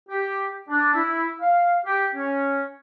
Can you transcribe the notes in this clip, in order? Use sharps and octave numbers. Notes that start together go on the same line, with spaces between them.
G4
D4
E4
F5
G4
C#4